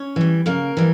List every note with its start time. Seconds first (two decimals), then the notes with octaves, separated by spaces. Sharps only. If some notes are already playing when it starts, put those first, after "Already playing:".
Already playing: C#4 C#5
0.16 E3 G3
0.46 C#3 A#3 A#4
0.77 E3 G3